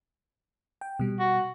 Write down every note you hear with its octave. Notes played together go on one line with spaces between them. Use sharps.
G5
B2 G3
F#4